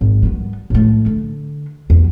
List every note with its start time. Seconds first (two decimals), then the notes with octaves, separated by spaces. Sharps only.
0.01 G#1
0.23 G3 B3
0.70 A2 A3
1.06 D3
1.90 E2